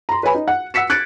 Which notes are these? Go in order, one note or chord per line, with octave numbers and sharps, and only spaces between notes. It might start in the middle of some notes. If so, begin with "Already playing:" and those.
A#5 C6
B4 C#5 G#5 B5
D#4
F#5
F#5 E6 B6 C#7 E7
F#6 G#6 A6 C#7 D7